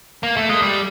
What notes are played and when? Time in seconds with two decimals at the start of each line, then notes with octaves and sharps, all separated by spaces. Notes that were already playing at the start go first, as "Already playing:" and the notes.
0.23 A#3
0.37 A3
0.49 G#3
0.62 G3